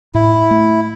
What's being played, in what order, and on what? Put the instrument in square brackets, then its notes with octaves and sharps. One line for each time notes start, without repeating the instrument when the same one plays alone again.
[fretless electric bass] A2 [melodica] E4
[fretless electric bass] A3